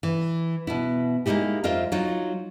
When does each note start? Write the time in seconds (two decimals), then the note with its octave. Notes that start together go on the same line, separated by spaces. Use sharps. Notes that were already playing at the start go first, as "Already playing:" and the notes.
0.03 E3
0.67 B2 B3 E4
1.26 G#3 A#3 C4 D#4 E4 G4
1.64 F2 F4 A#4 D#5 E5
1.92 F#3 D#4 F4